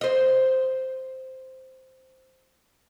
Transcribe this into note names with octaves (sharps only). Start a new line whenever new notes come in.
C5 D#5